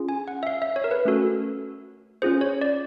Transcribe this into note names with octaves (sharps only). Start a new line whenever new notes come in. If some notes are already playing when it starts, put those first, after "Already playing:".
Already playing: C#4 F4 G#4
G#5
F#5
E5
F5
E5
C#5
A#4
B4
A3 C#4 F#4 A4
C#4 F4 G#4 C5
C#5
D5